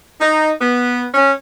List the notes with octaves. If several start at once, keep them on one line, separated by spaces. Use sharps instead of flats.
D#4
B3
C#4